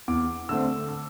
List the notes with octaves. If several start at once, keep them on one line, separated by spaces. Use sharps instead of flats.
E2 D6
D3 A3 C4 E6
E6